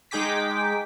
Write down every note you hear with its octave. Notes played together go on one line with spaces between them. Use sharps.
G#3 D#4 G#4 G5 D6 B6